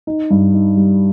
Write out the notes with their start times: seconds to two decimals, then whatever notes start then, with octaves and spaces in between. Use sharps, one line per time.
0.07 D#4
0.30 G2
0.54 D#4
0.77 G3